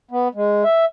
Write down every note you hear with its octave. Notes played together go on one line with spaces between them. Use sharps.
B3
G#3
E5